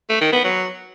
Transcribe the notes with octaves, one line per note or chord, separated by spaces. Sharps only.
A3
D#3
B3
F#3